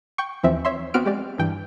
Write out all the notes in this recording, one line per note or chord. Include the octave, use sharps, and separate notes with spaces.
G5 C#6
D#2 E3 F3 C4 E5
C#5 E5 C6
B3 C4 F#4 F6 D7
G#3 G4 D5
G2 E3 G5